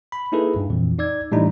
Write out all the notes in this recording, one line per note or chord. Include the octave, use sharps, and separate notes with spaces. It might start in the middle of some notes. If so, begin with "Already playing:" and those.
B5
A#3 D#4 E4 G#4 A4 B4
G2
F2 A#2 E3
D#4 D5 E6 G#6
A2 E3 G3 A3 D4 D#4